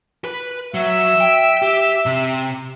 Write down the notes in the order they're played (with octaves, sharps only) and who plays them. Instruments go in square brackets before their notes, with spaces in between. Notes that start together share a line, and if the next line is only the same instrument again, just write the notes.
[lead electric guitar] B4
[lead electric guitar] F#3 [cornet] E5
[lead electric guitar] G5
G4
C3